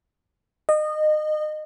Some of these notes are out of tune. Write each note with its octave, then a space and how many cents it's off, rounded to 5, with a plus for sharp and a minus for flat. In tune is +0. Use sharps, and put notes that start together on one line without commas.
D#5 -25